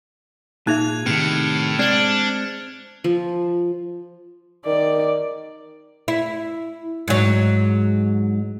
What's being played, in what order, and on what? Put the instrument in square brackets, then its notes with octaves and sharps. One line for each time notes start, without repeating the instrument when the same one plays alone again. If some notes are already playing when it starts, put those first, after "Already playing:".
[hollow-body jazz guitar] A#2 [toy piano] D#4 G#4 E5 [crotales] F#6 G#6 F7
[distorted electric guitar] A2 [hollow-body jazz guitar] C3 D#3 [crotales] F6 C#7 D7
[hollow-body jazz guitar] G#3 C4 C5 [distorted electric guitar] D4 [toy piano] D5 [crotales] F6 F#7
[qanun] F3
[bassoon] D#3 [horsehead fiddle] D5
[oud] E4
G#2 F#3